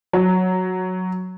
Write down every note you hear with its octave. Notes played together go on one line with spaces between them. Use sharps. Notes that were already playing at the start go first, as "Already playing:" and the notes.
F#3